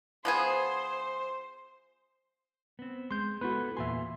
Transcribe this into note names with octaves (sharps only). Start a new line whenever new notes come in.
F3 B3 G#4 C5
B3 C4
G#3 C6 G6
B3 E4 F#4 A4 B4
E2 A#2 E5 G#5 C6